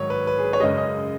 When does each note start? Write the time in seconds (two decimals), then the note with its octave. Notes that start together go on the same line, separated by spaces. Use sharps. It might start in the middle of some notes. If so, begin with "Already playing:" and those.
Already playing: G#2 D#3 F#3 C#5
0.10 B4
0.27 B4
0.38 G#4
0.45 B4
0.53 C#5
0.60 F#2 C#3 G#3 D#5
0.77 D#5